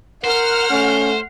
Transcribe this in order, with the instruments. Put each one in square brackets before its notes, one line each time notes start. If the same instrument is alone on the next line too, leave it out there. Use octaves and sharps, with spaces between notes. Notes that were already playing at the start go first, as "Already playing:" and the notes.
[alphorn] A#4 [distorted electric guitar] C5 [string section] F#5 F6
[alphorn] A3 [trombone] C#4